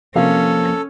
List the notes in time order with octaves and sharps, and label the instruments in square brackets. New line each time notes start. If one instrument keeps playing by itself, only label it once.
[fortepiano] C3 A#4 F5 [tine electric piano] F3 A#3 [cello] C#4 [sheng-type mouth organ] A4